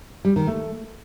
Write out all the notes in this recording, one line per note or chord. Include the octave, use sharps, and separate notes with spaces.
G3
D#3
A3